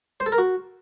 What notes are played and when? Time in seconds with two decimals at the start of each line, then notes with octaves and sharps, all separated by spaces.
0.20 C5
0.26 A4
0.32 A#4
0.38 F#4